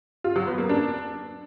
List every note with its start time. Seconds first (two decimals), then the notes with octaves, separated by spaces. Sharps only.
0.24 F4
0.36 F#3
0.47 B3
0.58 A#3
0.69 D4